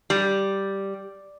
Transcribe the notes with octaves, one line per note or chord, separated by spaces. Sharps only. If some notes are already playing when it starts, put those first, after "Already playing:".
G3